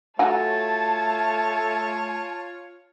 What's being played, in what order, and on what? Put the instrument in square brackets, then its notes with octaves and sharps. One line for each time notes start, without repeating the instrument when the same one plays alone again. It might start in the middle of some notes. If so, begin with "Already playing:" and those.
[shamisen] F#3 F#4 G#5 [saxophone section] A3 [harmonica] F4 C#5 [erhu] A5